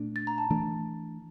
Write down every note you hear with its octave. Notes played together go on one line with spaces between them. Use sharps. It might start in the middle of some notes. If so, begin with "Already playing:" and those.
Already playing: A#2 A3 D4
A6
A#5
A5
E3 A3 D4